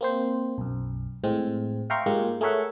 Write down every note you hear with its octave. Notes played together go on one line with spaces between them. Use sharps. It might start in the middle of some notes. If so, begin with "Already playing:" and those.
A#3 C4 C5
B1 F#2
A2 G#3 C4
E5 F5 G5 A#5 C6 C#6
G#2 G#3 A#3 F4 G4
A3 G#4 A#4 C#5 E5 F#5